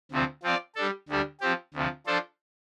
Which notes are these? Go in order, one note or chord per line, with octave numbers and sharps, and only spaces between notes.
D2 C3 F3 C4
F3 C4 F4 D5
G3 D4 A4
D2 D3 G3 D4
F3 C4 G4
D2 C3 F3
F3 D4 A4 C5